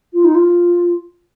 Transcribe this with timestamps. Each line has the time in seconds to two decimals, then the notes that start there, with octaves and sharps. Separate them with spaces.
0.13 F4
0.24 D#4
0.34 F4